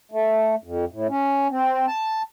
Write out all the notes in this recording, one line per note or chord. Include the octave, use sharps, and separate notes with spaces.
A3
F2
A2
C#4
C4
A5